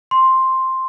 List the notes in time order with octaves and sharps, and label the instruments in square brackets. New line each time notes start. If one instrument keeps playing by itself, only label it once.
[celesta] C6